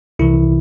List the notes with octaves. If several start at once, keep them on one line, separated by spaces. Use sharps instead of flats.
C2 C3 E3 E4